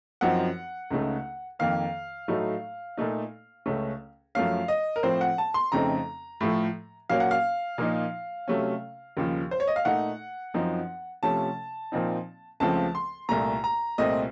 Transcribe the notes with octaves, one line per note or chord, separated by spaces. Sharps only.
F#2 F3 C4 D#4 F#5
C#2 C#3 A3 D#4
F2 D#3 A#3 F5
A2 F#3 A3 D#4
A#2 A3 D#4
C#2 C#3 A3 C#4
F#2 F3 A3 C#4 F5
D#5
A#4
A2 F3 C4 C5
F#5
A5
C6
F2 C#3 A3 C4 D#4 A#5
A2 F3 A3
A#2 F#3 A#3 C#4 F5
F#5
F5
A#2 F3 A#3 D#4
C3 F#3 A3 C#4
D#2 C#3 F3
C5
C#5
D#5
F5
A#2 A3 D#4 F#5
F#2 F3 C4 D#4
C3 F3 A3 C#4 A5
A#2 F3 C4 D#4
C#2 C#3 F3 A3 C4 A5
C6
C2 A#2 A3 A#5
A#5
C2 A#2 A3 C4 D#5